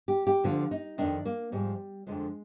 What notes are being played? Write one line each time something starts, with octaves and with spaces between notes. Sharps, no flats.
G4
G4
D2 D3 F3 F4
D#4
F2 D#3 D4
A#3
G#2 F3 G3
F2 D3 F3 G#3